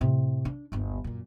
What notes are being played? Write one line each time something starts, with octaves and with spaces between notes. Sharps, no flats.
A2 C3
D4
G1 D#2
F#2 A#2